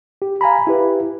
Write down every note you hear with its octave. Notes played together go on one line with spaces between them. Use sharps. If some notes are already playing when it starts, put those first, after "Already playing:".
G4
F5 G#5 A#5 B5
E4 G4 B4